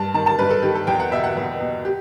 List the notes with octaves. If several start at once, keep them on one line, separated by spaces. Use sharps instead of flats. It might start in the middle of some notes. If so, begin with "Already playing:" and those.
Already playing: G2 A5
D#3 A5
A5
G2 B4
A4
D#3 G4
A4
E2 G5
F#5
B2 E5
F#5
E2
B2
G4